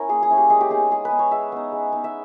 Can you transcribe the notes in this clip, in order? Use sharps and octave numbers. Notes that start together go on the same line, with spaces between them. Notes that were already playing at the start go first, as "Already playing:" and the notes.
Already playing: C#4 E4 A#4
A#3 G#4
G#4
C#4 E4
G4
G#3 G#4
G4
B3 D#4 G#4
G#3 G#4
B4
B3 D#4
C#5
G#3 E5
B3 D#4
G#3
B3 D#4
E5